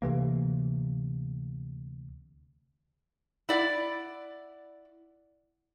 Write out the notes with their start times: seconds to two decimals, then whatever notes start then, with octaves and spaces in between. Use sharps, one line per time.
0.02 D2 C3 E3 A#3
3.49 E4 D5 F#5